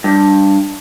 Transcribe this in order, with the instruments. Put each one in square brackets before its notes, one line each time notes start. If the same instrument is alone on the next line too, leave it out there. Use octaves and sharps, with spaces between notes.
[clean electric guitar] G2